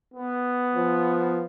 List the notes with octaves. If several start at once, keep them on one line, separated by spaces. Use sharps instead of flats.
B3
F3